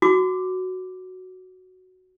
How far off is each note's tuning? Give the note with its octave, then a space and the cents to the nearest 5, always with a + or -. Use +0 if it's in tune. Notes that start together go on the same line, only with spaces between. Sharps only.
F#4 +0 D6 +0